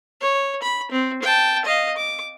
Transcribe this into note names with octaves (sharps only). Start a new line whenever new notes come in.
C#5
B5
C4
G5 A5
D#5 F5
D6